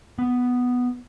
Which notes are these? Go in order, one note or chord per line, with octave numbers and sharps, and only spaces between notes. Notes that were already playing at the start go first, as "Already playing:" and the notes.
B3